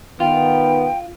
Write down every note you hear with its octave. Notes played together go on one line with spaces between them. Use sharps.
D#3 B3 F4 G5